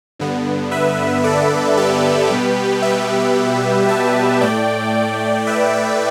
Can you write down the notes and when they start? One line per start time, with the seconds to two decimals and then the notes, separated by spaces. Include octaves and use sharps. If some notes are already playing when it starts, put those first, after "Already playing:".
0.19 G2 D3 B3
0.71 B4 E5
1.24 A4 D5
1.77 G4 B4
2.30 B2 G3 B3
2.82 B4 E5
3.88 E5 A5
4.41 A2 A3 D5 G5
5.47 B4 E5